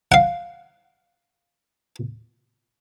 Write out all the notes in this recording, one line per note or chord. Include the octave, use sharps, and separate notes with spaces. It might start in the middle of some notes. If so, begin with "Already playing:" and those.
F5 F#5